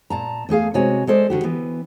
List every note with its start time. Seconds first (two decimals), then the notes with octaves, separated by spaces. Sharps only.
0.10 A#2 A5 A#5
0.49 E2 A3 G#4 F5
0.74 C3 G#3 F#4 C#5 G#5
1.07 G#3 A4 C5 D5
1.30 D3 F#4 G4
1.43 E3 B3